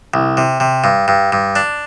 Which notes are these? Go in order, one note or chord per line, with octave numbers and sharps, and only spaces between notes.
C2
C3
C3
G2
G2
G2
D4